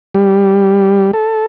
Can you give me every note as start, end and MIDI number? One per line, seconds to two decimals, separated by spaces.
0.15 1.11 55
1.13 1.46 69